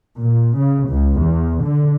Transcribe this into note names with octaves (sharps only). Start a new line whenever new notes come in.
A#2
C#3
C#2
E2
D3